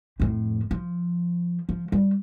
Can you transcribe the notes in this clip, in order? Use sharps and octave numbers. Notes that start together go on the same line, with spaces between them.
F2 A2
F3
F3
G3